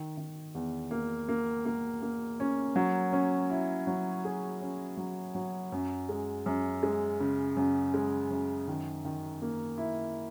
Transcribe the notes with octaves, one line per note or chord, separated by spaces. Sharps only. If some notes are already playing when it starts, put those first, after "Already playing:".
Already playing: D#3
D#3
E2
A#3
A#3
A#3
A#3
C#4
F#3
C#4
E4
F#3
G#4
C#4
F#3
F#3
F#2
G#3
F#2
G#3
C#3
F#2
G#3
F#2
D#3
D#3
A#3
E4